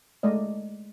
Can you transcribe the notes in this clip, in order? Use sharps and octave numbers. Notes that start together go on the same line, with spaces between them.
G#3 A3 D5 D#5